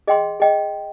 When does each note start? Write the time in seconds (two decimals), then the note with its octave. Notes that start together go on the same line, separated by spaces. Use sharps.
0.07 G#4 D#5 G5 C6
0.40 G#4 D#5 G5